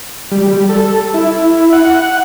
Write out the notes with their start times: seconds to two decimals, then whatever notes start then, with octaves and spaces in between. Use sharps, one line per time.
0.31 G3
0.48 G3
0.69 A4
1.14 E4
1.73 F#5